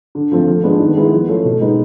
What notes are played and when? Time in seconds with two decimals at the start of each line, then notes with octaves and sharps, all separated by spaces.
0.15 D3
0.32 F3 A3 C4 F4
0.48 F3
0.64 G#3 B3 D4
0.80 D#3
0.96 G#3 B3 E4
1.12 F3
1.29 A3 C#4 F4
1.45 B2
1.61 G#3 B3 D#4